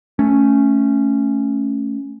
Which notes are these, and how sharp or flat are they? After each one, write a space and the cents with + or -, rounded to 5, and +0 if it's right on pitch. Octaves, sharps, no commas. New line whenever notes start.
A3 +0 C#4 +0